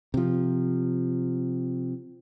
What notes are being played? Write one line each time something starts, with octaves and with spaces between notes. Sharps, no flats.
C3 F3